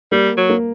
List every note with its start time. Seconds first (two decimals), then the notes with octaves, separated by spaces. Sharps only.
0.12 G3 A#3
0.37 F#3
0.50 A#3